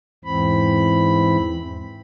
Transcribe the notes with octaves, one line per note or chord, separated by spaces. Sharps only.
E2 G#2 E3 C4 B5